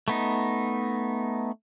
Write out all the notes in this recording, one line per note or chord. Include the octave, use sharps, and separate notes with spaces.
A3 B3 D#4